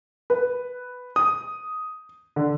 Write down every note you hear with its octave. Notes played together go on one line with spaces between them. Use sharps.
B4
D#6
D3